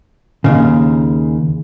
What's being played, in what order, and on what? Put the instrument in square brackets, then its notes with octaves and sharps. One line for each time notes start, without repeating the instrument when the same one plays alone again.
[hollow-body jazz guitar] D#2 G#2 C#3